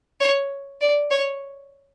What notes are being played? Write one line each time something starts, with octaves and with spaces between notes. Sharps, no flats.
C#5
D5
C#5